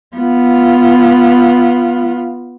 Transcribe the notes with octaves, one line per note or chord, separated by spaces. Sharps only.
B3 F4